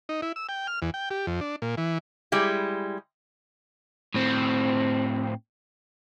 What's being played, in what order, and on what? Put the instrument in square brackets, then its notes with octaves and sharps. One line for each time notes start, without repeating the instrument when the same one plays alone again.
[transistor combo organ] D#4
E4
E6
G5
F6
E2
G5
G4
F2
D4
A#2
E3
[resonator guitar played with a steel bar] G3 G#3 E4
[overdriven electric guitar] A2 C4